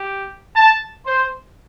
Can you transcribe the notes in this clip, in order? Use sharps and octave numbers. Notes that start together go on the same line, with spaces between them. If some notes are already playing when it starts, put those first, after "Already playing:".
Already playing: G4
A5
C5